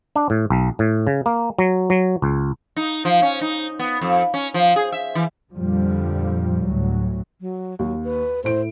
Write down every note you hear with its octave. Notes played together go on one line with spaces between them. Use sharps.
D4
A2
B1
A2
C#3
A#3
F#3
F#3
C#2
D#4
F3
C#4
D#4
B3
F2
C#4
F3
G#4
E5
E3
F2 A#2 D3 F3 G3
D2 A2 F#3
F#3
D#2 F#3
B4
A2 E4 C5 D7